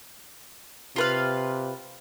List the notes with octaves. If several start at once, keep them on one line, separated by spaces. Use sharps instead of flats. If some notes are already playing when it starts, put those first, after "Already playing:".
C3 F4 B4 F5